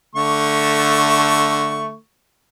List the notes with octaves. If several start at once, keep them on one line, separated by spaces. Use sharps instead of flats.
D3 A3 C#6